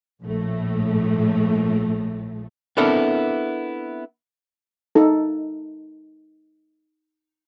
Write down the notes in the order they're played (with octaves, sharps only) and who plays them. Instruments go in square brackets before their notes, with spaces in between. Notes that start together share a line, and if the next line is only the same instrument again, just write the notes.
[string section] A#1 A2 A3
[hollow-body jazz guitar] B3 C4 D4 E4 A4 A#4
[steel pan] D#4 A4